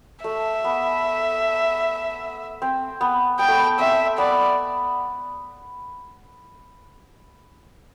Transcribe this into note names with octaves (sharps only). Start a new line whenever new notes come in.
A3 E5
B3
C4
B3
B3 G5
A3
B3
C4 E5
B3 D5